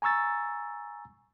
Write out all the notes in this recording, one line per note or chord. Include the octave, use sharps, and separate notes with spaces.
G#5 A#5 C#6 E6 A6